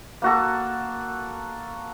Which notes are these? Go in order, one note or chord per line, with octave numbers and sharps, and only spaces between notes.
A#3 F#4 A4